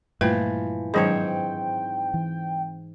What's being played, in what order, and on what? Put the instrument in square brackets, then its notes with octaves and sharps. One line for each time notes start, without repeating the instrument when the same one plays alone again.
[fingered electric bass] G2 A#2 [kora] E3 F3 [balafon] A3 B4 G5
[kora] G#2 C4 C#5 [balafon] D#3 F#3 D4 [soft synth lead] G5
[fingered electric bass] E3